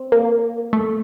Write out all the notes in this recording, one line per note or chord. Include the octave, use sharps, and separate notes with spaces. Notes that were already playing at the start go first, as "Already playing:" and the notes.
Already playing: C4
A#3
A3